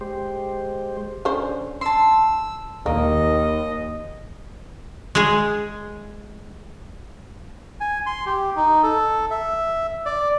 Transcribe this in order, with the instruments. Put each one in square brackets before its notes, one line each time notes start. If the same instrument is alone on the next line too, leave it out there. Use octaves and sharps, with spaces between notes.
[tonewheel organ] G#3 G4 C5
[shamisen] D3 C#4 C5
[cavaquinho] A5 C6 [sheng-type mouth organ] E6
[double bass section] D#2 [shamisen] A#3 [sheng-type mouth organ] D#5
[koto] G#3 G#4
[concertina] G#5
C6
G4
D#4
A4
E5
D5